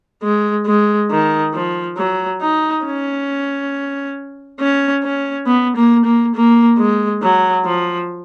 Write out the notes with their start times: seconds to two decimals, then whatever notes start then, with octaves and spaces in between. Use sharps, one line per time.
0.22 G#3
0.66 G#3
1.10 D#3
1.54 F3
1.98 F#3
2.42 D#4
2.85 C#4
4.60 C#4
5.03 C#4
5.47 B3
5.76 A#3
6.05 A#3
6.35 A#3
6.79 G#3
7.22 F#3
7.65 F3